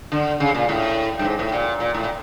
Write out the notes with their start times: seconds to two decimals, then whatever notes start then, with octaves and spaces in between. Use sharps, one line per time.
0.12 D3
0.40 C#3
0.55 A#2
0.69 A2
1.19 G2
1.24 G#2
1.39 A2
1.52 A#2
1.80 A#2
1.94 A2
2.04 A#2